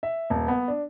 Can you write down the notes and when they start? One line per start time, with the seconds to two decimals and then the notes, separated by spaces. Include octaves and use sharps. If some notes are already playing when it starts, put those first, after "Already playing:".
0.03 E5
0.30 D#1
0.48 B3
0.68 D4